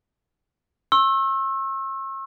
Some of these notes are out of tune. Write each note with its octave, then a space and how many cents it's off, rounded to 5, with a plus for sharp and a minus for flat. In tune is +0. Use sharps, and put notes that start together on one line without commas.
C#6 -45 E6 +0